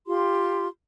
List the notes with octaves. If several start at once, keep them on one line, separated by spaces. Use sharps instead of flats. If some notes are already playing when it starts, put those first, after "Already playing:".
F4 G4 C6